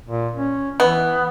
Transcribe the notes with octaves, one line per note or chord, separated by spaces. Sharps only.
A#2
C#4
E3 B3